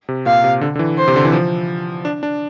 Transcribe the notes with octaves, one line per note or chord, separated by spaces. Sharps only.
C3
A#2 F5
C3
D3
D3
E3
C5
C3
D3
E3
F3
D4
D4